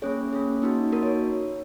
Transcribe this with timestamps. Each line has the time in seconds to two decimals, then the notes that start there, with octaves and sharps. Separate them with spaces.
0.02 A#3 C#4 G#4 C#5
0.33 A#3 C#4 G#4
0.62 A#3 D#4 F#4
0.92 A#3 D#4 F#4 A#4
1.03 C#5